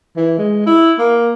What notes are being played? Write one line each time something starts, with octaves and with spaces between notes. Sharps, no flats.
E3
G#3
E4
A#3